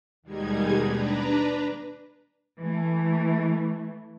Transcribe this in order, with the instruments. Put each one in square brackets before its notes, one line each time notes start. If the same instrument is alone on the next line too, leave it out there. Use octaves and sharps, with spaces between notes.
[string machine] D#2 B2 G3 G#3 D#4 G#6
D4 B4 A#5
[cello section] E3 A3